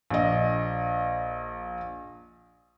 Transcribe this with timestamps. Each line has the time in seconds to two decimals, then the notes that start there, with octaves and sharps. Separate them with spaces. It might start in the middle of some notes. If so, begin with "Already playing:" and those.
0.10 A#1 D#5